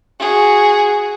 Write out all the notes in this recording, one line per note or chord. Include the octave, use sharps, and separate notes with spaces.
F#4 G#4